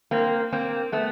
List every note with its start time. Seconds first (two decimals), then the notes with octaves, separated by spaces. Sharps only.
0.11 A#3 C4
0.52 A#3 C4
0.92 A3 B3